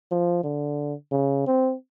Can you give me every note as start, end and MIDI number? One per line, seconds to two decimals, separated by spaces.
0.11 0.43 53
0.43 0.94 50
1.11 1.43 49
1.47 1.74 60